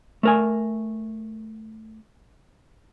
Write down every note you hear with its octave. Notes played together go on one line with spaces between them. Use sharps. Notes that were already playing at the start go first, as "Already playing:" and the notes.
A3 A#4 G#5